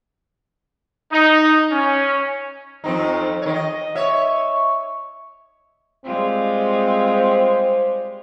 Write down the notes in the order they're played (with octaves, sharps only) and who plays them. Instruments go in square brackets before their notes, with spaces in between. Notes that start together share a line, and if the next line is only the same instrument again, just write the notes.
[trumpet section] D#4
C#4
[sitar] F2 C4 D#4
D#3 C#5
D#5
C#5 E5
[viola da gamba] G3 G#3 F4 [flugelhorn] C4
[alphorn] C5